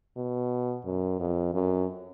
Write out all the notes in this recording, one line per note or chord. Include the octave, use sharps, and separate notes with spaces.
B2
F#2
F2
F#2